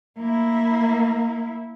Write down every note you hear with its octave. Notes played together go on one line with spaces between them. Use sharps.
A#3 E4